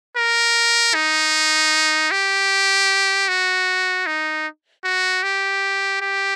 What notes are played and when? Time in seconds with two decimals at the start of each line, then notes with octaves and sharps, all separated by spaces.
0.16 A#4
0.94 D#4
2.11 G4
3.28 F#4
4.06 D#4
4.84 F#4
5.23 G4
6.01 G4